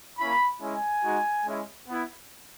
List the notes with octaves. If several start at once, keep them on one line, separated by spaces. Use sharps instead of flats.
A#3 C#4 E4 B5
G#3 C#4 E4 G#5
G#3 D#4 F#4
G#3 C#4 E4
B3 E4